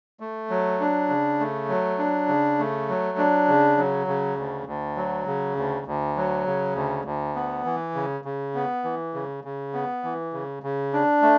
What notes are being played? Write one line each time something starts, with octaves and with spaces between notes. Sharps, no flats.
A3
F#3
D4
C#3
A3
F#3
D4
C#3
A3
F#3
D4
C#3
F#3
C#3
D2
D2
F#3
C#3
D2
D2
F#3
C#3
D2
D2
B3
E3
C#3
C#3
B3
E3
C#3
C#3
B3
E3
C#3
C#3
D4
A3